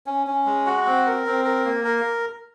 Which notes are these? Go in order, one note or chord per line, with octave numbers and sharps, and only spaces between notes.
C#4
C#4
G#3
F#4
C4
A#4
C4
A#4
A#3
A#4